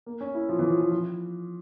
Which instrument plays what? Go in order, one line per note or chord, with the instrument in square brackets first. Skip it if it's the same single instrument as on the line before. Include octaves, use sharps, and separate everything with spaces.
[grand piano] A#3
C#4
E4
F3
E3
F3
F3
F3